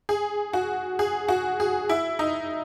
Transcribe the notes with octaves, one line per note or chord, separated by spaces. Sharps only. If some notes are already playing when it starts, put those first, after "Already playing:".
G#4
F#4
G#4
F#4
G#4
E4
D#4